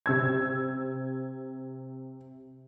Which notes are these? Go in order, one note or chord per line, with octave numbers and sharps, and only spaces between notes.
C3 E6 G#6